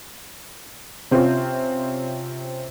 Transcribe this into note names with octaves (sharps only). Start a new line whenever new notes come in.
C3 C4 C#4 F4